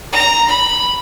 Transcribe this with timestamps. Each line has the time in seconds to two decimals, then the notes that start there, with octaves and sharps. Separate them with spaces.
0.12 A#5
0.48 B5